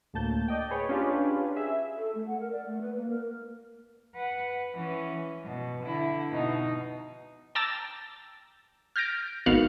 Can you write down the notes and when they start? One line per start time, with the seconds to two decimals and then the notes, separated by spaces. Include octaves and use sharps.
0.14 D2 A2 A#3 A5 G6
0.48 D5 D#5 G5
0.70 G#4 B4 C#5
0.89 C#4 D4 F4 G4 G#4 B4
1.56 G#4 E5
1.98 A4
2.15 A3
2.27 F#5
2.40 A#4
2.52 D5
2.66 A3
2.81 B4
2.97 A#3
3.10 A#4
4.15 B4 F#5
4.75 E3 C#4
5.45 B2
5.83 D3 E4
6.29 B2 D#4
7.55 G5 A5 A#5 D6 E6 A6
8.96 F6 G6 A6 A#6 D7
9.46 G#1 D#3 B3 F#4 F5 F#6